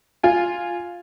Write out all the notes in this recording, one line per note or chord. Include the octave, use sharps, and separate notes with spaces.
F4 G#5